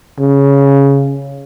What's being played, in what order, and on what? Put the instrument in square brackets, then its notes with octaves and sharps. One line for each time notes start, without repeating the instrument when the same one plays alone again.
[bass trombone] C#3